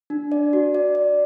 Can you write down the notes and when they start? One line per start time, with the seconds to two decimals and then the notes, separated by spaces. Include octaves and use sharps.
0.10 D4
0.32 D5
0.53 F#4
0.75 D5
0.95 D5